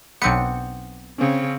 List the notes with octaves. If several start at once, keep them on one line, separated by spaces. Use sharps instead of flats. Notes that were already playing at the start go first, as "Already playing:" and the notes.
B1 B3 C4 D4 C#7
C#3 C4 C#4